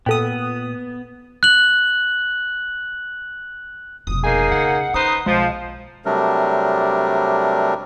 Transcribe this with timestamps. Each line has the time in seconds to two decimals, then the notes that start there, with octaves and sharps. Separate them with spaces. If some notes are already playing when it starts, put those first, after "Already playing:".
0.06 A#2 B3 A4 G5 D#6
1.43 F#6 F#7
4.07 F1 B2 D#6
4.24 A#3 D#4 G#4 G#5
4.52 C#3 F#5
4.94 C#4 D#4 B4 C5 D#6
5.26 B1 F3 G#3
6.05 C3 F#3 G3 A3 D4 A#4